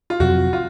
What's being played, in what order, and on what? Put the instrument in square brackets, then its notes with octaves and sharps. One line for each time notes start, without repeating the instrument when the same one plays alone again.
[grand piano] F4
[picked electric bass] F2 C3 F#3 C4 [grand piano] F#4
[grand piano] F4